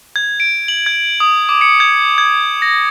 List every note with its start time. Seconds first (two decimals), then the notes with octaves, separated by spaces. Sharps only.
0.16 G#6
0.40 D7
0.68 F#7
0.86 G#6
1.20 D#6
1.49 D6
1.61 C#7
1.80 G#6
2.18 G#6
2.62 A#6